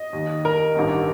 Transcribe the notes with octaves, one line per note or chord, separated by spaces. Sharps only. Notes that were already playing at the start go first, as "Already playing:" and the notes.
Already playing: D#5
D#2 D#3
A#4
A1 G2 D#3